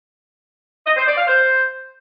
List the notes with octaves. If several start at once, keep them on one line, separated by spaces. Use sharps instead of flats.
D#5
C5
D5
F5
C5